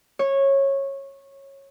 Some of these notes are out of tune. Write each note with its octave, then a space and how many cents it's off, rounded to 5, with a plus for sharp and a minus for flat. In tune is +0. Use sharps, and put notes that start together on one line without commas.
C#5 -15